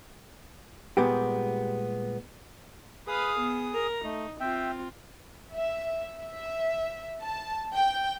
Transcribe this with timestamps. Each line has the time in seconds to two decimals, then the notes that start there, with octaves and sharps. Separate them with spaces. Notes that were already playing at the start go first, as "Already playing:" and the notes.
0.97 A#2 G3 G#3 B3 G4
3.07 G#4 B4 F5 D#6
3.39 B3
3.73 A#4 A#5
4.04 A3 D#4
4.40 C4 F4 E5 G5
5.55 E5
6.22 E5
7.23 A5
7.76 G5